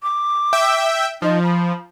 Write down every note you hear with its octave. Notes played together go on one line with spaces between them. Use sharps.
D6
E5 G5
F3 D#4
B5